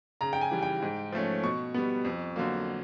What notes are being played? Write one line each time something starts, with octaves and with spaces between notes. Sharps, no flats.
C#3 A#5
G5
G#5
E3 G3
G5
G#2
F3 A3 C#4
B2 C#6
G3 B3
F2
D3 F#3 A#3